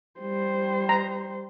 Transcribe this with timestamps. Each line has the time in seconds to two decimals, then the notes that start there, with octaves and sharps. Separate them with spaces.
0.20 G3 C5
0.89 A#5